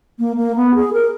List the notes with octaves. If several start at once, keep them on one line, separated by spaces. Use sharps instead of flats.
A#3
A#3
B3
G#4
A#4